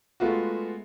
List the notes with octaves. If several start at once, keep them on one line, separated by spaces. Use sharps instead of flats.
G#3 A3 B3 F4 F#4